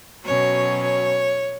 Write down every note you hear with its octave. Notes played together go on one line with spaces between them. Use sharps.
B2 F#3 C#4 C#5
C#5